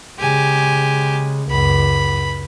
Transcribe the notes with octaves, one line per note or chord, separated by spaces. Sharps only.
C#3 G#3 G4 G#5
C#2 F#2 B5